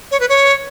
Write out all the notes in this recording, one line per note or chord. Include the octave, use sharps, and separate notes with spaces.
C#5
B4
C#5